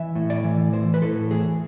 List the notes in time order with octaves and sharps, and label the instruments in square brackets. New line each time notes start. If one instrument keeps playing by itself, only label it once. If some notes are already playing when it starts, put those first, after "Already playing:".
Already playing: [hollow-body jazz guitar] E3 E5
A2
D5
E3
E3 C5
B4
A2 A4
E3 G#4